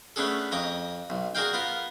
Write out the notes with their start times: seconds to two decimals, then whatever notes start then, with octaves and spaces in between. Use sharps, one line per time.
0.16 A3 B3 C#4 D4 G#4 A4
0.52 F2 C#5 D#5 A#5 D6 D#6
1.10 B1
1.35 F#4 G#4 A#4 D5 F5 G5
1.53 B3 F4 A#4